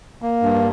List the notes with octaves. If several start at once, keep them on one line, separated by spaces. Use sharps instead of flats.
A#3
G2